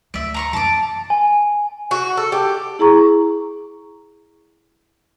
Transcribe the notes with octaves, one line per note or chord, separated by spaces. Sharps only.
D2 D5 E5
A#5 C6 C#6
F#2 A#3 A5 D6
G#5
F#4
A4
G4
E4 G#4 A#5 C#6